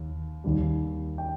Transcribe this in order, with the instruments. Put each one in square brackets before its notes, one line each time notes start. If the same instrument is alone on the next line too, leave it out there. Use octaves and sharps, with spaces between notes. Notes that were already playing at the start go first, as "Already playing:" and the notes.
Already playing: [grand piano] D#2
D#2 D#3 G3
G5